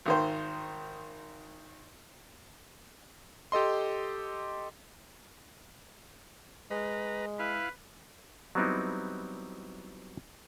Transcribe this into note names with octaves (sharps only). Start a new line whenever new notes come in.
G#1 D#3 C5
G4 A4 D#5 C6
G#3 B4 A#5
E4 B4 F5
F#3 G3 B3 C4 D#4 E4